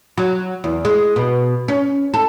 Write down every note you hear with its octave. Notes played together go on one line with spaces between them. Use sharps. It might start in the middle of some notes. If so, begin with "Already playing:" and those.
F#3
E2
G#3
B2
C#4
A4